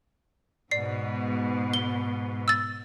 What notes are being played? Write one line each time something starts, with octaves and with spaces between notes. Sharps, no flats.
G#2 B2 D5 C7
G7
E6 A6